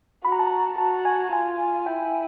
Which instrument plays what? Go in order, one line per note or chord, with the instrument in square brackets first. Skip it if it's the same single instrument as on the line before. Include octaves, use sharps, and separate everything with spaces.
[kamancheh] F#4 [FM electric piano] B5
[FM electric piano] A#5
A5
A#5
[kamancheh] F#4 [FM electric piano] A5
[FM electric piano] G#5
[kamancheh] F4 [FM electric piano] G#5
[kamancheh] E4 [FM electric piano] G5